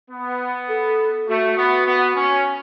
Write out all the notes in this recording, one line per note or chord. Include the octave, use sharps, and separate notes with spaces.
B3
A4
A3 F#4
B3
B3
C#4